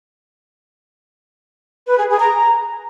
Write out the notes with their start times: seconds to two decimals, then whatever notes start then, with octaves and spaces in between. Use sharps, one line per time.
1.87 B4
1.98 G#4
2.08 G#4
2.19 A#5